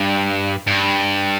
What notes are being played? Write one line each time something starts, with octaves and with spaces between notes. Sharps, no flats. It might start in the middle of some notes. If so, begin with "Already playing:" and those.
Already playing: G2
G2